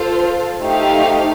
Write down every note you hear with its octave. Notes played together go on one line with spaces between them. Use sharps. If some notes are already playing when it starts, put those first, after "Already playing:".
Already playing: F4 A4 C5
A3 D#4 G4 C5 F5